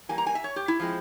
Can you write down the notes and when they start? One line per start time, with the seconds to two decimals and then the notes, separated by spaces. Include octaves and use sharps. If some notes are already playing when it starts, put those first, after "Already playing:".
0.09 E3 G3 A#3 G#5
0.18 A#5
0.27 G#5
0.35 E5
0.44 C#5
0.56 G4
0.68 E4
0.80 F3 G#3 C4